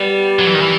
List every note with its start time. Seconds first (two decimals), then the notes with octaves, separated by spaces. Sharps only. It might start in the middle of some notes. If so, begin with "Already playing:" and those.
Already playing: G3 B3
0.39 F#3
0.47 E3
0.54 D#3
0.61 E3